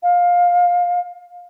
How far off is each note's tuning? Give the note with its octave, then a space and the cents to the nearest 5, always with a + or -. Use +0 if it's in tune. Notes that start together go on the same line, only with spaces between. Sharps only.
F5 +20